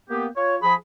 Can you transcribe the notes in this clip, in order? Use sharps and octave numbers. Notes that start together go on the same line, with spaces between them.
A#3 B3 G4
F4 C#5
F3 G#4 B5